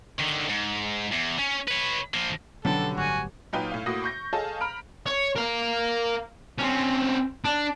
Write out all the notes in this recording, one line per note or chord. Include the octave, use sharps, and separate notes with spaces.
D3 D#3
G#2
E2
C#4
B4 C#5
F3 A#3
B2 D3 F#3 B3 C#4 G4 A4
G1 A2 F#4 G#5
A#2 F#3 D#4 B4 F5 G5
A2 F5
A2 A#3 F#4 D6 D#6 A#6
C#6 G6 A#6
G#4 A4 C#5 D#5 F5 A5
A#5 B5 F6 D7
C#5
A#4 F5
C4 C#4
D4